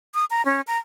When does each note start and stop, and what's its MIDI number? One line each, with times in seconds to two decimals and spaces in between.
0.15 0.25 87
0.30 0.44 82
0.45 0.61 61
0.67 0.78 82